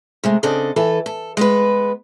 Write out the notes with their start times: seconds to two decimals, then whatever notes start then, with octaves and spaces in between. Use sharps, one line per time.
0.24 C3 G#3 A3
0.43 C#3 C4 D4 A4 D#5
0.76 E3 A4 B4
1.06 A4
1.37 G#3 B3 B4